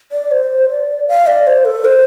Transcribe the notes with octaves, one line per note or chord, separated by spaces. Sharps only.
D5
C5
D5
F5
D5
C5
A4
C5